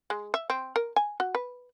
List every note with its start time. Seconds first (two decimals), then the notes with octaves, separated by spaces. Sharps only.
0.10 G#3
0.34 E5
0.50 C4
0.76 A#4
0.96 G#5
1.20 F#4
1.35 B4